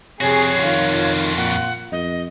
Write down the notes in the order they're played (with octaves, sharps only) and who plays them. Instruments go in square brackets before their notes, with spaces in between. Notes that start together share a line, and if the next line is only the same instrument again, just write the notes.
[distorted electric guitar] F2 F#4 [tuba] C3 [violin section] G#4 C7 [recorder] C#5
[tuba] D#3 [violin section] F4
[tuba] A#2 [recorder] F#5
[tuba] F2 [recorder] D#5